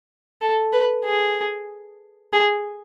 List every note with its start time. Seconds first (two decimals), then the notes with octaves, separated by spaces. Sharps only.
0.41 A4
0.73 B4
1.05 G#4
2.33 G#4